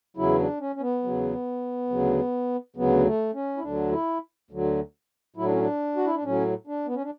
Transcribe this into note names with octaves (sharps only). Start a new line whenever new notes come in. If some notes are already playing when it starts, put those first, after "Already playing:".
E2 C#3 F#3 E4
D4
C#4
C#4
B3
E2 C#3 F#3
D2 C#3 F#3
D2 C#3 F#3 B3
A3
C#4
E4
D2 D3 F#3 D4
E4
D2 D3 F#3
A2 F#3 E4
D4
C#4
D4
F#4
E4
D4
A2 F#3 C#4
D4
B3
C#4
D4